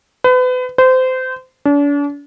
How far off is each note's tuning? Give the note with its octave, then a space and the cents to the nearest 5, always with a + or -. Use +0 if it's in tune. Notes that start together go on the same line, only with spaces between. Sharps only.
B4 +35
C5 -25
D4 -40